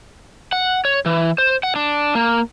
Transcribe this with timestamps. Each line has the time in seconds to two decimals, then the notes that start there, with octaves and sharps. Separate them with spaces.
0.53 F#5
0.85 C#5
1.06 E3
1.38 C5
1.63 F#5
1.76 D4
2.15 A#3